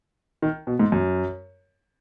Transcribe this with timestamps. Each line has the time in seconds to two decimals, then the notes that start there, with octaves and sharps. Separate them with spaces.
0.42 D#3
0.67 B2
0.79 G#2
0.92 F#2